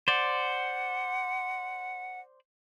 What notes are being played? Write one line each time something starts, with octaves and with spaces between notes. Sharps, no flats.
C5 D5 F#5